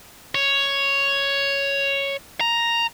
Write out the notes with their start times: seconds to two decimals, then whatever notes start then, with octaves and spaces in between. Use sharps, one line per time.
0.35 C#5
2.41 A#5